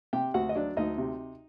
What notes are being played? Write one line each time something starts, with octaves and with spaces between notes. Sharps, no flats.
C3 G4 G5
D2 F#4 F#5
D#5
F#3 D4 D5
D2 D#4 D#5
C3